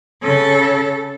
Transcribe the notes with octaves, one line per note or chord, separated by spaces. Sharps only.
C#3 A4